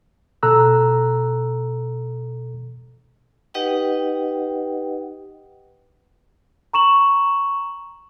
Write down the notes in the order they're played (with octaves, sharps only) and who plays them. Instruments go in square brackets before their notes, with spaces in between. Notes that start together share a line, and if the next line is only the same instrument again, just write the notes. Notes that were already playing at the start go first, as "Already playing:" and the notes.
[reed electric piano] B2 A4 A#5 E6 F#6
[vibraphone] D#4 G4 B4 D#5 F#5 G5
[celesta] A#5 C#6 E7 F#7